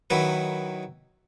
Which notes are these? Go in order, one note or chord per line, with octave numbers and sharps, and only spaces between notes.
D#3 F#3 E4 B4